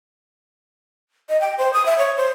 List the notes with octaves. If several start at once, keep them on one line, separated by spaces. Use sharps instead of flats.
D#5
G5
C5
D#6
E5
C#5
C5